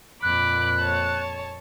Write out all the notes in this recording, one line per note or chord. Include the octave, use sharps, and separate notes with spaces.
F2 A#2 B5 D6 F#6
C#5 A5